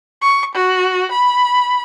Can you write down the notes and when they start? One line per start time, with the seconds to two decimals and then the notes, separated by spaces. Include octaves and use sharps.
0.22 C#6
0.55 F#4
1.12 B5